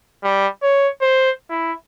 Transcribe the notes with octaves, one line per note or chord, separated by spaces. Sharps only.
G3
C#5
C5
E4